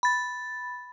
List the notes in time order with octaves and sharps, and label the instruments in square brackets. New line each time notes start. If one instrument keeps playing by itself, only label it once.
[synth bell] B5 A6